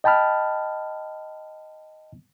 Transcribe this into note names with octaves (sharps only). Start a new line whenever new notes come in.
D#5 G5 A5 B5 F6